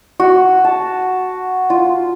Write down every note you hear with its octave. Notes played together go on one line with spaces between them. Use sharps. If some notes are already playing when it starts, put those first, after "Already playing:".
F#4
A5
F4